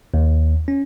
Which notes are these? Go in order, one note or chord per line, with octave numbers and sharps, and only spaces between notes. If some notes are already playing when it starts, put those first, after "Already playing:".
D#2
C#4